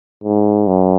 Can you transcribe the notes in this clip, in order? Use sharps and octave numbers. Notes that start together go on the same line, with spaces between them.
G#2
F#2